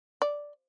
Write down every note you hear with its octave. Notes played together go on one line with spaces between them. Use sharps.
D5